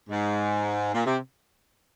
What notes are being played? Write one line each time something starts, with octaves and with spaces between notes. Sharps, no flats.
G#2
A#2
C3